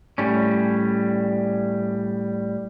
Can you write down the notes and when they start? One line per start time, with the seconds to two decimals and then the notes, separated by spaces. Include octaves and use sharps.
0.18 A2 G3 C#4